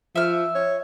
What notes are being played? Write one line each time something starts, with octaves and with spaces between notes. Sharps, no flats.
F3 E5 F6
C#5